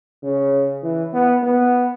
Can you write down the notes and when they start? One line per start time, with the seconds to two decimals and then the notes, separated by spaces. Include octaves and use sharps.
0.23 C#3
0.83 E3
1.13 B3
1.43 B3